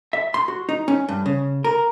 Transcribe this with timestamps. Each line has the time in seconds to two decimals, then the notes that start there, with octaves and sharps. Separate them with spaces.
0.13 E5
0.34 C6
0.48 F#4
0.69 D#4
0.88 C#4
1.09 G2
1.26 C#3
1.64 A#4